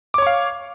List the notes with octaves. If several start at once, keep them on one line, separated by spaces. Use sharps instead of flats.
C#5 F5 C#6 D6